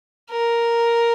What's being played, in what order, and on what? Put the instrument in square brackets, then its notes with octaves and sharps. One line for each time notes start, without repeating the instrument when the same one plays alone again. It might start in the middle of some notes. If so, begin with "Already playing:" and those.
[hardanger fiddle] A#4